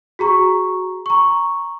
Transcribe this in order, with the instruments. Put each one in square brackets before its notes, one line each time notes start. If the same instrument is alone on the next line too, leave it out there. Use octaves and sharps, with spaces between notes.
[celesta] F#4 G#4 A#5 C#6
A#5 C#6